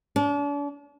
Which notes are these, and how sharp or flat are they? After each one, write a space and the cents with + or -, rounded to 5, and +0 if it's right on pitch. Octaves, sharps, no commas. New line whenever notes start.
D4 -40